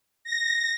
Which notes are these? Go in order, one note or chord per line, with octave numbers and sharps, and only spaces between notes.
A#6